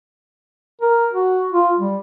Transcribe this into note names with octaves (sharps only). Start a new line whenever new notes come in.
A#4
F#4
F4
G3